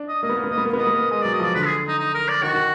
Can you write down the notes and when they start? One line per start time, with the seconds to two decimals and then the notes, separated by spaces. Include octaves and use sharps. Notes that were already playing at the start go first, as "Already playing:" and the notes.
Already playing: D4
0.09 D#5
0.23 A#3 D#5
0.29 B3
0.37 A#3
0.44 B3
0.51 A#3 D#5
0.58 B3
0.65 A#3
0.73 B3
0.78 A#3 D#5
0.87 B3
0.95 A#3
1.11 G#3 D#5
1.22 F#3 D5
1.33 D#5
1.40 F3 D5
1.55 D3 B4
1.66 G#4
1.88 D#4
1.99 D#4
2.14 A#4
2.28 D5
2.43 D#3 F#4
2.54 D#3